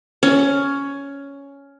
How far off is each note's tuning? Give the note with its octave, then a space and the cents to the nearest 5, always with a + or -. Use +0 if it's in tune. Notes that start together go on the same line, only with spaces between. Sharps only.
C#4 +10